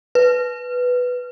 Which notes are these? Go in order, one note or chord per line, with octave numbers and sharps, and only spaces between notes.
B4